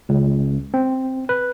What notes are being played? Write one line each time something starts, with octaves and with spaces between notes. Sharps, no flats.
C#2
C4
B4